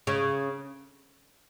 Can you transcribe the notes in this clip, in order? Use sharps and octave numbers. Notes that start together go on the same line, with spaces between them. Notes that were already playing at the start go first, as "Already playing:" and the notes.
C#3